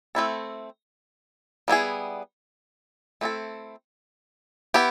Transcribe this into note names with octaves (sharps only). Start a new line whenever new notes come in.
A3 C4 E4 A4
G3 B3 E4 G#4
A3 C4 E4 A4
B3 E4 G4